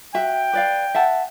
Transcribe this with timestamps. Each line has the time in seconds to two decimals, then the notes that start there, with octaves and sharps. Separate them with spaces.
0.14 F#4 E5 G5
0.53 B4 D5 F5
0.94 E5 F#5 A5